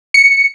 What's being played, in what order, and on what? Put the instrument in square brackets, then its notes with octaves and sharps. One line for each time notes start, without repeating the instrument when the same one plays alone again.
[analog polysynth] C#7